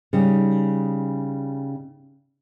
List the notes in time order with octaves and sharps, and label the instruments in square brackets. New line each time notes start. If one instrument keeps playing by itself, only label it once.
[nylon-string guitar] C#3 G3 C#4 D#4